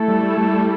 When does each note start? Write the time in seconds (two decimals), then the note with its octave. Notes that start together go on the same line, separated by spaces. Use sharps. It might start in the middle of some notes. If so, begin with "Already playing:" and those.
Already playing: A3 E4 A4
0.08 G3
0.23 G3
0.38 G3